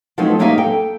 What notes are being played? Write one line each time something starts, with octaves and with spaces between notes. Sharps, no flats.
F3 F#3 A3 B3 C4 D#4
F#3 G3 A#3 D#4 E5 F5
A4 G5